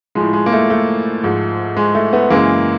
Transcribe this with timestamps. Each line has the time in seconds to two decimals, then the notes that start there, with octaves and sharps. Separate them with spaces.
0.15 A2 F3 G#3
0.33 G#3
0.46 A#3
0.52 A3
0.70 A3
1.23 G#2 F3
1.77 G#3
1.95 A3
2.13 A3 B3
2.30 F#2 C#3 E3 G#3 A#3